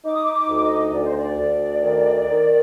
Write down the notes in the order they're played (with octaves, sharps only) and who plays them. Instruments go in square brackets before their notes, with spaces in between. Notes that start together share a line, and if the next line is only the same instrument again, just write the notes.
[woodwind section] D#4 [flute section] D6
[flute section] D#6
D6
D6
[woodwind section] D2
[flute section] D#5
[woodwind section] D2 [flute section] D5
[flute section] C5
D5
[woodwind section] D2
D#3
D#3